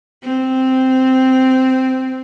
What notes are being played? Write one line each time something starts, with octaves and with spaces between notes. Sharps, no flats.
C4